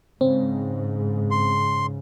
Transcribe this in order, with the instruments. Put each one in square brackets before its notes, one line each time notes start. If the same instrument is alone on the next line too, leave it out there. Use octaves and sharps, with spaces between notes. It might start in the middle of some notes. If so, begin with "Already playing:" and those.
[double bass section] G#2 [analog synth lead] C#3 [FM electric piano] C4
[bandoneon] C6